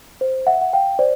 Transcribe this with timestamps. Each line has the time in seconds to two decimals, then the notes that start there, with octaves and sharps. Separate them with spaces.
0.21 C5
0.47 E5 F#5
0.61 F#5
0.73 F5 G5
0.99 C5 D5